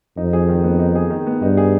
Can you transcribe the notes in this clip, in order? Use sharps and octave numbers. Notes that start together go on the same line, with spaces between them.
F2 D#4
G#4
D#3
B3
D#4
G#4
D#3
B3
G2 D#4
G#4